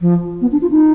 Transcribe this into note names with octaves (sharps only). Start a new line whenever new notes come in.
F3
B3
D4
F4
D#4